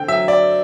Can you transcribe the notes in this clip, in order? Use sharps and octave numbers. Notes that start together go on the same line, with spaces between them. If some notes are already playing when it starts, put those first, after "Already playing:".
Already playing: D3 C4 G5
F#3 E5
D5